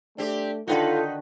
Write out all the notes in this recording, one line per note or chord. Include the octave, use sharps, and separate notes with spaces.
A3 C4 D4 G4
D3 D#3 D#4 F4 F#4 A4 B4